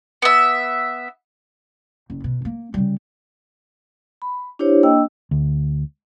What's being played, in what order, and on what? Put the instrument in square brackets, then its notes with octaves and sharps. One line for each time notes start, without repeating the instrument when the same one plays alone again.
[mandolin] B3 E5
[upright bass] F#1
B2
A#3
C#3 G3
[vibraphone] B5
D4 E4 G4 C5 C#5
A#3 D4 D#5 G5 E6
[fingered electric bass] D2